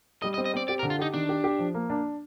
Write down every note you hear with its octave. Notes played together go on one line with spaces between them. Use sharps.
G3 D#5
D#5
C4
D#5
C4 D5
G4 D5
A#4
D3
F4
D#4 G4
D#3 D4
G4
G4
F3
A#3
D4